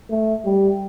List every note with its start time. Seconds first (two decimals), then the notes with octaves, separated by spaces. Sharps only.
0.11 A3
0.45 G3